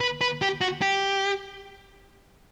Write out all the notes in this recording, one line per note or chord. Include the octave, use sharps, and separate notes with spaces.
B4
B4
G4
F#4
G4